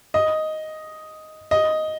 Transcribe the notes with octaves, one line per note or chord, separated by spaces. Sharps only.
D#5
D#5